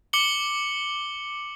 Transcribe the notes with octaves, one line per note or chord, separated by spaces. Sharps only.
D6 C#7 F#7 G7